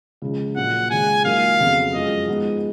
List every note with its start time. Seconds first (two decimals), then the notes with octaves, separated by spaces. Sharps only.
0.22 C#2 C#3 F3
0.56 A#1 A#2 F#3 A#3 F4 F#5
0.90 C#2 C#3 G#3 G#5
1.25 G#2 F#3 A#3 F4 A#4 F5
1.60 F2 C#3 F#3 B3
1.94 F#2 F3 G#3 D#5
2.28 G#2 F3 G#3 B3